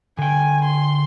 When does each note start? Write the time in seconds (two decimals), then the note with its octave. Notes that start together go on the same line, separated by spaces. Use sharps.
0.18 D3 G5 G#5
0.65 C6